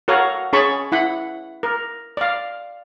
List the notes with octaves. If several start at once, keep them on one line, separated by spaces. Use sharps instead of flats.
F#4 A4 A#4 C#5 F5 F#5
C#4 G#4 C#5 A5 B5 C#6
E4 F#5 B5
A#4
D5 F5